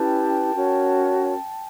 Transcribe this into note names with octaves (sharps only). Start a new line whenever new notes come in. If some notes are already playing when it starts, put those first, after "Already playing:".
Already playing: C#4 E4 G4 B4 G5 A5
C#4 F#4 A#4 C#5